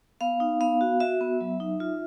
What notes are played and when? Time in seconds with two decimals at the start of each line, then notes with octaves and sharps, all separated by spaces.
0.21 B3 F5
0.40 D#4
0.61 B3 F5
0.81 F#4
1.00 F#4 E5
1.21 B3
1.41 F#3
1.60 D#4
1.80 F4